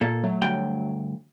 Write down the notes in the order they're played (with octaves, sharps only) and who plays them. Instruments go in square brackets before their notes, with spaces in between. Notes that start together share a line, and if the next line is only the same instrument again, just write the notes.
[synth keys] A#2 [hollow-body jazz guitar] A#3 A4
[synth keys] F#3 A3
[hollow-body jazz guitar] D2 G2 G5